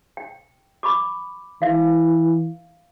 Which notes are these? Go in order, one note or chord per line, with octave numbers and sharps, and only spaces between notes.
G5
B5 C#6 D6
E3 E5 F5